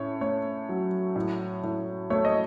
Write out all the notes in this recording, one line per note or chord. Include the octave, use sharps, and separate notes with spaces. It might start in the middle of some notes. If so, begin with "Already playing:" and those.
Already playing: A2 C#4 C#5
A3 C#5
F#3
A2
A2
A3 C#5
D#5